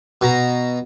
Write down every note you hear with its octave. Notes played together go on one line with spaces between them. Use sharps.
B2 A#5